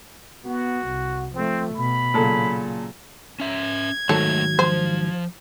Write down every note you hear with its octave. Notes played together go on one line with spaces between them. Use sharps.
B3 F#4
C2
F3 A3 C4
B2 B5
A#2 C#3 F#3 A4
C#4 E5 G#6
G#2 D#3 F#3 A3 D#4 A4 C#5
F3 C5